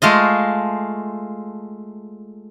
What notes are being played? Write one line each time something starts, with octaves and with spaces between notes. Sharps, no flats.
G#3 A3 F4 D#5